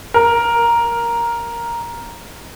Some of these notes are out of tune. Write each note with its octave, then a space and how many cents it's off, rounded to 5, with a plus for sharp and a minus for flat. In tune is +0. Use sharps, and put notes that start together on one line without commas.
A#4 +5